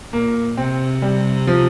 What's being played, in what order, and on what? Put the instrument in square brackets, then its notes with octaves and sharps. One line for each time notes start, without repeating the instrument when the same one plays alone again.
[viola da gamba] A#2 [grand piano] A#3
[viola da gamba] C3 [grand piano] C4
[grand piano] G3
F3